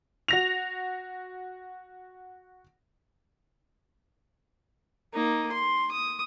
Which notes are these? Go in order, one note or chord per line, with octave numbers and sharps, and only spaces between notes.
F#4 A#6 F7
A#3 D#4
C6
D#6